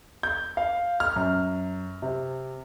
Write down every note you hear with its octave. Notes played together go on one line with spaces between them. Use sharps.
G6
F5
F6
F#2
C3